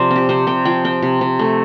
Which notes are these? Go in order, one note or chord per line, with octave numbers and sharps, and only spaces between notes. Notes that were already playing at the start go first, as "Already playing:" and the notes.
Already playing: C3 F3 C5 D5
C4
G4
C3 C5
C3 G5
F3 G5
C4 G5
C3
C3
A3